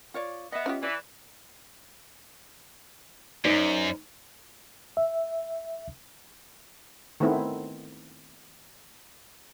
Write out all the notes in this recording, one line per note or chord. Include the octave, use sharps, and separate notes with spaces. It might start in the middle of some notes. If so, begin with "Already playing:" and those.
F4 C#5 D5
B3 D#5 E5
C#4 F4 G4
E3 D5
F#2 D#4 C5 D5
E5
D#3 A3 B3 C4 E4